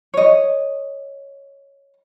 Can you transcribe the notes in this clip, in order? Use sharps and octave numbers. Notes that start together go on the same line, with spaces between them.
C#5 D#5